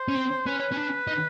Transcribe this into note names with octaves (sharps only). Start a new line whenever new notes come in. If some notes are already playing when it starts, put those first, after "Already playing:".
Already playing: C5
C#4
C4
C#4 B4
C#4
D4
D#4